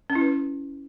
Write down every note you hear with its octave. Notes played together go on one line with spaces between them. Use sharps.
C#4
E4
B4